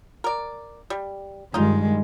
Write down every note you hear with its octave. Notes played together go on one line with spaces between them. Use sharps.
A#4 D5
G3
G2 D#3 G3 G#3 D#4 F4